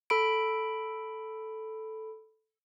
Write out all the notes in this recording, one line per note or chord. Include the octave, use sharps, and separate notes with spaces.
A4 B5 D7